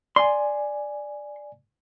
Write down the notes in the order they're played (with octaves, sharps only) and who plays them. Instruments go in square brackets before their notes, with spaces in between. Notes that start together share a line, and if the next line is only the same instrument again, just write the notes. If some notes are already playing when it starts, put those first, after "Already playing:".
[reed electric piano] D5 G#5 [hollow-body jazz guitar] C6